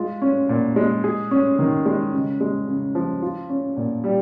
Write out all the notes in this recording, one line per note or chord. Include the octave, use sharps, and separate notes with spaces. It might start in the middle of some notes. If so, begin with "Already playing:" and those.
Already playing: G#3 F4
C#4
A#2
G#3
G#4
C#4
D#3
G#3
C#3
G#3
C#3
F3
F4
C#4
A#2
G3